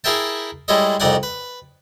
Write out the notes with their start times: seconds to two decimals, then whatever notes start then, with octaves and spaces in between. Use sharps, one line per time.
0.04 E4 G#4 A#4 E5 G5 A5
0.68 G3 G#3 E4 A4 C#5 D#5
1.00 C2 F2 D#4 D5 F#5 G#5
1.23 B4